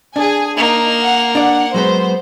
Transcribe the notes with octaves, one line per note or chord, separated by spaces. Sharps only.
D4 G#4 G#5
A#3 D#4
F#5
D4 D5 F#5
F#3 G#3 B3 C5